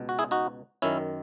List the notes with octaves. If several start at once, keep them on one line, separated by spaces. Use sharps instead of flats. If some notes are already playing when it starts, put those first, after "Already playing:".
Already playing: C#2 B2
F#4
E4 G#4
D#4 F#4
F#2 D#3 C#4 E4